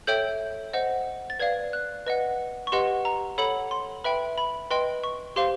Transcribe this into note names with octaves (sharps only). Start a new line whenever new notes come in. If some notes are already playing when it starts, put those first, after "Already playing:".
A4 C#5 E5 G5 G6
C5 D#5 F#5
A6
B4 D5 F5 G#6
F#6
B4 D#5 F#5
C#6
G4 B4 D#5 F#5 C6
A#5
A4 C#5 F#5 B5
C6
B4 E5 G5 B5
B5
B4 D#5 G5 C6
C#6
G4 C5 F5 C6